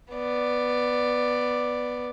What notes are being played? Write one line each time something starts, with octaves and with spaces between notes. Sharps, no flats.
B3 D5